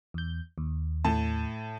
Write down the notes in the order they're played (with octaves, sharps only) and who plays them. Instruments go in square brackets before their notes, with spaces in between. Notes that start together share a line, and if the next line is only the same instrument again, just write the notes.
[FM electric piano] E2 G6
D#2
[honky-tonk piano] A2 A5